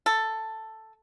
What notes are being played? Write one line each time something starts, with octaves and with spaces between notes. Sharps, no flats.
A4